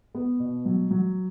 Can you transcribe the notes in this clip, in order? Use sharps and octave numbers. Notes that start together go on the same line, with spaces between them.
B3
B2
F#3
F#3